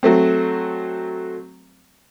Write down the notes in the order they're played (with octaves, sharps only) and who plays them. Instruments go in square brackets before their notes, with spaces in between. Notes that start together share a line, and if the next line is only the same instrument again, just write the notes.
[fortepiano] F#3 A3 C4